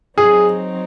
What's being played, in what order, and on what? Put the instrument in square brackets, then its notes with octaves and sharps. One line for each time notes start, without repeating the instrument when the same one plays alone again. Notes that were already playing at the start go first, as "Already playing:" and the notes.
[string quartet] F#3 C4 D#4 [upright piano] G#4